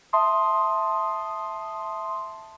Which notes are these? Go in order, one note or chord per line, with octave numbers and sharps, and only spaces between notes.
E5 A5 C6 D#6